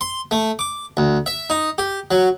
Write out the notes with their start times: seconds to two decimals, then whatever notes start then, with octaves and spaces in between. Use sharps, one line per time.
0.01 C6
0.31 A3
0.59 D6
0.97 D2
1.26 E5
1.50 D#4
1.78 G4
2.11 F#3